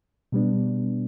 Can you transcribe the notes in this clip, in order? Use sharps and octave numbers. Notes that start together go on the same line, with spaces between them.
B2 G3 B3 D4